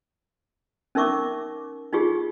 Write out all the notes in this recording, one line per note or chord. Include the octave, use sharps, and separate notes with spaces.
C#4 D#4 A#4 E5 C#6 D6
D#4 F4 G4 G#4